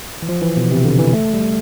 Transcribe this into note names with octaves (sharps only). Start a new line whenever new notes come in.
E3
F3
E3
B2
C3
D3
E3
A3
G3